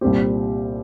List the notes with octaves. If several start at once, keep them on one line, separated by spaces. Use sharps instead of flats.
C2 A#2 G3 C4 G4